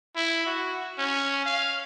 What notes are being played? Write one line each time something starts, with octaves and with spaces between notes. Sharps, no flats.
E4
F#4
C#4
F5